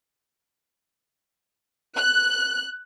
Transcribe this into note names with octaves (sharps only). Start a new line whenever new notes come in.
F#6